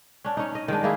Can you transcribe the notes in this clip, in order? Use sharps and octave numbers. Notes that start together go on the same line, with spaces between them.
C#4 D4
C#4 D#4
D#5
D#3 G#3 D4
G#3 A#3 E4 G#4